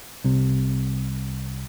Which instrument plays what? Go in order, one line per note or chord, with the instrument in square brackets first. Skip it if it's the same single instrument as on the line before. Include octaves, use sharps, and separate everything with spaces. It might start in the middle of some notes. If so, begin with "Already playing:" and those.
[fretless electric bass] C2 C3